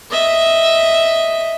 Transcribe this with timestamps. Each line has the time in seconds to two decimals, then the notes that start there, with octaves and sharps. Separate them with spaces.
0.11 D#5 E5